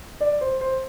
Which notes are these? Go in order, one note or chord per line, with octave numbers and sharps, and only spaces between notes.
D5
C5
C5